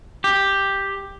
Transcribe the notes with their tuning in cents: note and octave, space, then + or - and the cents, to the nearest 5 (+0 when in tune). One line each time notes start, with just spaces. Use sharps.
G4 +5